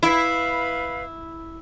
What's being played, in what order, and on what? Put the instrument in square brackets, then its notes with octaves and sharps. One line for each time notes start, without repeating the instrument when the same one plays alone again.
[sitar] E4 [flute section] B4 F5 B5